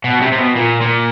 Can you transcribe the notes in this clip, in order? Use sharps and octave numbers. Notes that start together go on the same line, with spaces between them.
B2
C3
C3
B2
A#2
A#2